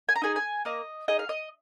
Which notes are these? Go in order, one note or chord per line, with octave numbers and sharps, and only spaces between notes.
G#5
A#5
D#4 G#4 G#5
G#5
A#3 D#5
D#4 G#4 D#5
F5
D#5